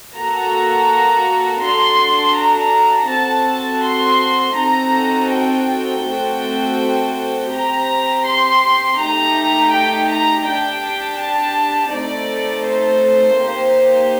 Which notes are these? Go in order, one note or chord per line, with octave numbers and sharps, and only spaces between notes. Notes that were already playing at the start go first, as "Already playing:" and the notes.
A#3 F#4 A4 A#5
D4 F#4 A4 C6
A#5
C4 F#4 A4 A5
C6
C4 D#4 F#4 A4 A#5
G5
A3 C4 F#4 A4
C4 G4 A#5
C6
A3 D#4 G4 A#5
G5
A#5
D4 G4 G5
A5
A3 C4 D#4 A4 D5
C5
A#3 D#4 G4